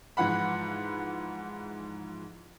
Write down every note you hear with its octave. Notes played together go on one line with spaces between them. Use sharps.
G#2 E3 F3 F#5 B5